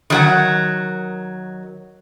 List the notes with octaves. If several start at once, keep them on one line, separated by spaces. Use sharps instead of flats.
D#3 F#3 F#5